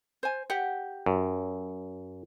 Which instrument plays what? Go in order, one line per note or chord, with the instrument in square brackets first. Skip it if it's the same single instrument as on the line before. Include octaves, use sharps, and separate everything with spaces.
[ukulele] C5 G#5
G4 F#5
[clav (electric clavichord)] F#2